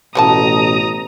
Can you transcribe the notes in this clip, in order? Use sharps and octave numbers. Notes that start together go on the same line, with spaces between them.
A1 B2 G3 C#5 A5 A#5 D#6